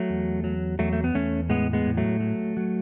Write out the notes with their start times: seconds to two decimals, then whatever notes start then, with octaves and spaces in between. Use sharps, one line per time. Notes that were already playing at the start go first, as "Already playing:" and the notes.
Already playing: F#3 A3
0.10 E2
0.44 F#3
0.79 E2 F#3 A3
0.93 A3
1.04 B3
1.15 E2 A3 C#4
1.49 A2 G#3 B3
1.73 G#3 B3
1.86 A2
1.97 F#3 A3
2.20 F#3
2.57 F#3